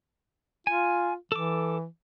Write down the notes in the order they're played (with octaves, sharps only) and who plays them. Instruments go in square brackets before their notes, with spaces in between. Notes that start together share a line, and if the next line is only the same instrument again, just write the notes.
[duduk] F4 [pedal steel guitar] G#5
[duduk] E3 [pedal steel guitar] A4 D6